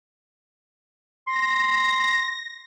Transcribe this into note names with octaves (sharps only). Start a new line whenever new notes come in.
C6 A#6